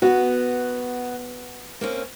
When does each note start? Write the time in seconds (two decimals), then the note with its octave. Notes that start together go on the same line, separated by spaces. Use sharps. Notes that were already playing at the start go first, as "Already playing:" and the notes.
0.02 B3 F#4
1.81 A#3 C4 C#4